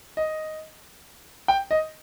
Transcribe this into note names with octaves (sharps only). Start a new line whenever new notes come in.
D#5
G5
D#5